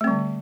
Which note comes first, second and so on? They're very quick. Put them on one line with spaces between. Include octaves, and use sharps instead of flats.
A3 C4 G3 D3